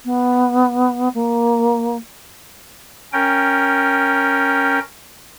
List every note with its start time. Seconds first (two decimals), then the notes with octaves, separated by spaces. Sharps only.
0.05 B3
1.14 A#3
3.13 C#4 A#4 G5